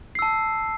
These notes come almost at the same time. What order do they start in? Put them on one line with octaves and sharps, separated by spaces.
C7 E6 A5